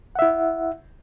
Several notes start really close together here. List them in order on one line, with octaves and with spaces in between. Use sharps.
F#5 E5 E4